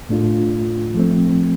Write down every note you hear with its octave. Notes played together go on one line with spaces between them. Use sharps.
A2 A3 D4 F4
F3 A3 C4